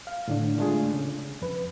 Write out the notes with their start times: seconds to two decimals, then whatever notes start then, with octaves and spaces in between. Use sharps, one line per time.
0.07 F5
0.28 A2 D3 D4
0.58 G#3 A3 D4 F4 G#4
0.94 C#3
1.42 F2 B4